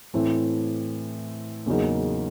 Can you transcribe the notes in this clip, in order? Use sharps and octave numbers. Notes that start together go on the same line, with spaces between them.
A2 E3 A3 C4
E2 C#3 F#3 A#3 D#4